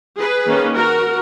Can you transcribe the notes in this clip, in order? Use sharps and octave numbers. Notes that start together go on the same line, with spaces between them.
G#4 B4
D#3 A#3 C#4
F#4 A#4